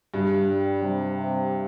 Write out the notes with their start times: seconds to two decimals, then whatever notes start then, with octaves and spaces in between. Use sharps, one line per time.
0.14 G2
0.48 G3
0.83 C3
1.16 C3